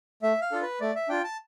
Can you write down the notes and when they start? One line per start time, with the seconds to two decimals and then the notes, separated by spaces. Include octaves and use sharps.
0.22 A3 E5
0.41 F5
0.52 D4 F4 A4
0.62 B4
0.80 A3 D5
0.95 E5
1.09 D4 F4 G5
1.24 A5